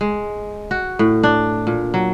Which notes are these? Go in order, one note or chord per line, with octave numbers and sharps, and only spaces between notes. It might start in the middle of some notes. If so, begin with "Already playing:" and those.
G#3
F#4
A2
D4
A#2
F#3